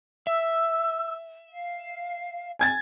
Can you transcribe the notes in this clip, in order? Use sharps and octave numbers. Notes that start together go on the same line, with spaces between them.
E5 E6
F5
G#5 G#6 A6